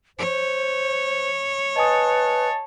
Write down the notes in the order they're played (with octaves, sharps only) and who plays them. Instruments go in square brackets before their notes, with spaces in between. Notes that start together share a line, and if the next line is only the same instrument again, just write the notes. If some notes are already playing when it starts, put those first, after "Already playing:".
[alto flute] C5 [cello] C#5
[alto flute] B4 [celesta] D#5 G#5 D#6 [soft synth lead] A5